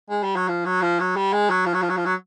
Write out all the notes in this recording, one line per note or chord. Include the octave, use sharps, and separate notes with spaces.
G#3
G3
F#3
F3
F#3
F3
F#3
G3
G#3
F#3
F3
F#3
F3
F#3
F3
F#3